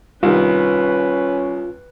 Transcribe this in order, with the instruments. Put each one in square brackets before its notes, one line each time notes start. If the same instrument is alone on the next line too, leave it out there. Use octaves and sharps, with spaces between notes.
[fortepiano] C2 D#3 [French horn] C#4 [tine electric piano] F4 [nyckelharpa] B4